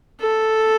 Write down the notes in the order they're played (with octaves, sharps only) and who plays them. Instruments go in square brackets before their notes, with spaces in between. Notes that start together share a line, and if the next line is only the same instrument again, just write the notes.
[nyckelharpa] A4